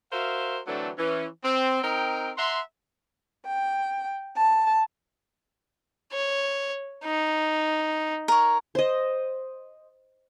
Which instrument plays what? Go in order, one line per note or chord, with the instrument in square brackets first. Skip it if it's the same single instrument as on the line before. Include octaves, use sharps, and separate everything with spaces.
[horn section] F#4 A#4 C5 E5 F5
D3 E3 F#3 A3 C4 D4
E3 C#4
C4
C4 D#4 A#4 D#5 G5
E5 F#5 A#5 C6
[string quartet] G5
A5
[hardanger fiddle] C#5
D#4
[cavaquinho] A#4 C#5
[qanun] C5 D#5